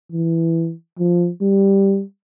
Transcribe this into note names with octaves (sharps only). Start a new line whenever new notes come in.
E3
F3
G3